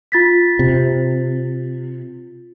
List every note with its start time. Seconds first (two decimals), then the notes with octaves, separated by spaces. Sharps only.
0.12 F4 A6 B6
0.59 C3